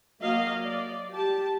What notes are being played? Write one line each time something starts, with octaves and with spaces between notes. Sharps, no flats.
F#3 A#3 D#5 F5
D5
G4 A5